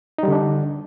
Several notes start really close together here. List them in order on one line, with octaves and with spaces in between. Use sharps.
D#4 G3 D3 D4